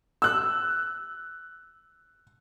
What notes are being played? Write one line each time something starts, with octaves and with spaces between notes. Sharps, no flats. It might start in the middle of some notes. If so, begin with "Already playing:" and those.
E6 F#6